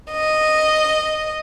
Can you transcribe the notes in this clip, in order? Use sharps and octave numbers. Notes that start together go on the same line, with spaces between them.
D#5